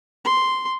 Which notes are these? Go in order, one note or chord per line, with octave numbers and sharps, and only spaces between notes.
C6